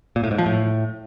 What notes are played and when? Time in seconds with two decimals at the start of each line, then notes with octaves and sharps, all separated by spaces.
0.16 A#2
0.23 A2
0.31 G#2
0.38 F3
0.46 A2